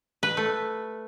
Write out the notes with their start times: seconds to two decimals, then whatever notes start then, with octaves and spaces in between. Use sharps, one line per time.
0.23 B4
0.37 A3